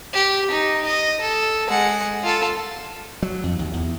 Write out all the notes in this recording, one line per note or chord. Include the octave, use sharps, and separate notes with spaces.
G4
D#4
D#5
A4
G#3 F#5
F4 A4
F#3
F2
D#2
E2